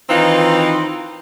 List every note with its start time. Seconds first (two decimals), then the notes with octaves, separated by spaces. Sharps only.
0.09 D#3 E3 C4 D#4 F4 B4